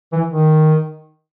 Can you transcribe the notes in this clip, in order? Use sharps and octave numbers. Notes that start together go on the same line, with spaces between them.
E3
D#3